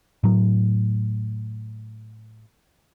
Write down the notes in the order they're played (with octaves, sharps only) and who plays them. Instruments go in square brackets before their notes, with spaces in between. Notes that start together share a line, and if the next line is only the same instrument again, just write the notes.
[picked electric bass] A2 F#3